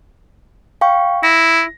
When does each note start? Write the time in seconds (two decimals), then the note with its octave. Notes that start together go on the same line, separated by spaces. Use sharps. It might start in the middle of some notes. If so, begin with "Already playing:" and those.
0.81 F5 G5 C#6
1.23 E4 A#6